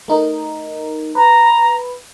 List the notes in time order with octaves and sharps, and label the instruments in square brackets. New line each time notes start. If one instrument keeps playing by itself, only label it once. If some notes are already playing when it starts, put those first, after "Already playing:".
[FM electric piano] A3 D#4 A#4
[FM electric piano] B4 [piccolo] A#5